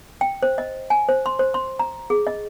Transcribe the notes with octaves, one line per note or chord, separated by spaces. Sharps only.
G5
C5
D#5
G#5
C5
C6
C5
C6
A#5
G#4
D#5